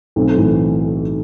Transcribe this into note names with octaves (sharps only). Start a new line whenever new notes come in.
B1 A3 C4
A2 E3